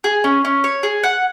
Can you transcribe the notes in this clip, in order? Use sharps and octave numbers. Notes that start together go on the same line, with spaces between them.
G#4
C#4
C#4
C#5
G#4
F#5